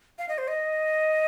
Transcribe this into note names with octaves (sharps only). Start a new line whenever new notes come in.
F5
D#5
C5
D#5